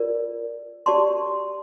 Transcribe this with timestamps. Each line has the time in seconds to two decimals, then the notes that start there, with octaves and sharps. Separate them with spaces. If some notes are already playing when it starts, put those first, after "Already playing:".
Already playing: F4 A#4 D5
0.86 G4 D5 A5 C6